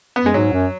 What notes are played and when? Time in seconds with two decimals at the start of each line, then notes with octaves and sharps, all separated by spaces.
0.16 B3
0.24 F#2 G#3
0.34 G#2 F#3
0.53 F#2